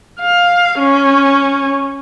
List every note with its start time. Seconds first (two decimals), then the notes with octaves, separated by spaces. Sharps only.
0.21 F5
0.79 C#4